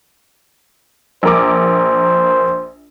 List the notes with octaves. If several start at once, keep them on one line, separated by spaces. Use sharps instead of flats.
A#1 A#4 C5 D6